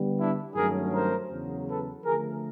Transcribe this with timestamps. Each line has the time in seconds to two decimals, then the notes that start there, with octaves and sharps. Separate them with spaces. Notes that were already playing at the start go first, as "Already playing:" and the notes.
Already playing: D3 G3 B3
0.17 D4 E4
0.54 G2 D#3 F#3 A3 C#4 G#4 A#4
0.92 A#4 C5
1.30 E2 C#3 F#3
1.67 A4 B4
2.04 D3 F3 A3 G#4 A#4